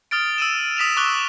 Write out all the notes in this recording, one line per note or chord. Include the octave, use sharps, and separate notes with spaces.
D#6 F6 A6 D7
E6 D#7 E7
D#6 B6 E7 F7
C#6 D6 E6 F#6 G7